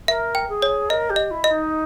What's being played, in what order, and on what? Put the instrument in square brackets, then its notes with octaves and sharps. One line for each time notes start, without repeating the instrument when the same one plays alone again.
[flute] A#4 [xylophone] E5
[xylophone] G5
[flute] G#4
[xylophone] C#5
[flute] A#4 [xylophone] D#5
[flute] G4
[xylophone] D#5
[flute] E4
[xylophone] D#5
[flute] D#4